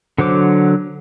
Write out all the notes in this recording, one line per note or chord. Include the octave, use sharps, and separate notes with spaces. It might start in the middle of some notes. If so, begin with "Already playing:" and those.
D3 F#3 C5 D6